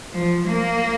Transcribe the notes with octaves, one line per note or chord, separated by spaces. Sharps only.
F3
A#3